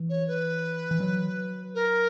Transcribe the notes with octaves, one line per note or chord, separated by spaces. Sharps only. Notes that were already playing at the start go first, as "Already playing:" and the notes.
Already playing: E3
C#5
B4
E3
F#3
A#4